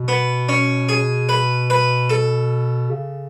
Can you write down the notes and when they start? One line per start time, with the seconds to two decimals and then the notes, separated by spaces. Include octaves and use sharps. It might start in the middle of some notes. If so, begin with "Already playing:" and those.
Already playing: B2
0.08 B3
0.49 C#4
0.89 G#4
1.29 B4
1.70 B4
2.10 A4
2.91 C#3